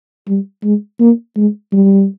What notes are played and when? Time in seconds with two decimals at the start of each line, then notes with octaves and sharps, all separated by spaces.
0.28 G3
0.64 G#3
1.00 A#3
1.37 G#3
1.73 G3